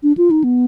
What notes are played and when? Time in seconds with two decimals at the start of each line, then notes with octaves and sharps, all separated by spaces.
0.03 D4
0.18 F4
0.31 D#4
0.44 B3